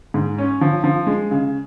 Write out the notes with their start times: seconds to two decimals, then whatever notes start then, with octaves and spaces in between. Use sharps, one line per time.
0.14 G#2
0.38 C#4
0.61 F3
0.84 F3
1.07 G#3
1.31 C#3